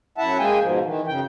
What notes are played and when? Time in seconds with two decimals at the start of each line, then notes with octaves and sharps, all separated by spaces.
0.18 F#2 E4 E5 F#5 A5
0.39 G#3 A#3 G#4 G5 G#5
0.61 G#2 B2 F3
0.85 D#3 E3
1.07 F#2 C#3 G5